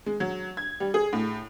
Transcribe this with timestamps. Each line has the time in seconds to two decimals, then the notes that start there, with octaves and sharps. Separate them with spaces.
0.06 G#3
0.20 F#3
0.57 G#6
0.80 G3
0.94 G#4
1.13 A2